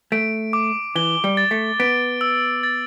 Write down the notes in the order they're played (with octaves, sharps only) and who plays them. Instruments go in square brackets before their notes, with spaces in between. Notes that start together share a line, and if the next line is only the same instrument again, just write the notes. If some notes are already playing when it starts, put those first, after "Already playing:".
[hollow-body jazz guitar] A3 [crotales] D7
[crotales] D6
[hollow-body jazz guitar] E3 [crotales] G7
[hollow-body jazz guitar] G3
[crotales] A6
[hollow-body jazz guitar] A3
[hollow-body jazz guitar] B3 [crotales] D7
[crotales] E6
A6